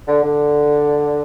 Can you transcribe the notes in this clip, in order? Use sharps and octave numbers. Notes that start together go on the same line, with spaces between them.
D3
D3